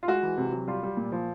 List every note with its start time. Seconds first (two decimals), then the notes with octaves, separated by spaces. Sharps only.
0.03 F4
0.08 G#3 F#4
0.23 E3
0.38 C3
0.52 F#3
0.68 G3 F4
0.83 G3
0.97 A#2
1.12 F3